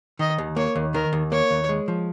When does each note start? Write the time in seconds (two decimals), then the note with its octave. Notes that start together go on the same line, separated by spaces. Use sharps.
0.19 D#3 D#5
0.38 D#2
0.56 A#3 C#5
0.75 D#2
0.94 D#3 A#4
1.13 D#2
1.32 A#3 C#5
1.51 D#2
1.69 G#3
1.88 F3